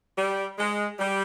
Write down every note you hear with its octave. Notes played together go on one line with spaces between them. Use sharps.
G3
G#3
G3